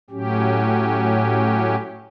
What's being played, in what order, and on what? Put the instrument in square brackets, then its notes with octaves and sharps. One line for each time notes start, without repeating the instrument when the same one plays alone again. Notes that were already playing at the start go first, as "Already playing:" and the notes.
[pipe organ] A2 F#3 C#4 G4